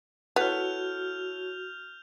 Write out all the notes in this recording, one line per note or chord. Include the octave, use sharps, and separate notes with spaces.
B3 E4 F#4 A4 C#5 F6 G6 F7